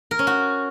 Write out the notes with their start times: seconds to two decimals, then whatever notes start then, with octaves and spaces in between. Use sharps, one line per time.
0.11 A#4
0.19 C#4
0.27 F#4